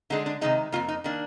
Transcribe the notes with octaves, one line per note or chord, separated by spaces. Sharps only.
D3 G#3 D4 D#4
D4
C3 D#3 G#3 D#4
F2 D#3 A#3 F4
D#4
D#3 A#3 D4